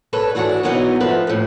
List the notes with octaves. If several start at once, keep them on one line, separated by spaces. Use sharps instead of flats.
A4 B4 C#5
E3 D4 F#4 G#4 C#5
B2 E3 F#3 B3 D#4
F3 A3 B4
F2 A2